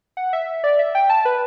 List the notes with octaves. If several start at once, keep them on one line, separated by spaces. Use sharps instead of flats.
F#5
E5
D5
E5
G5
A5
B4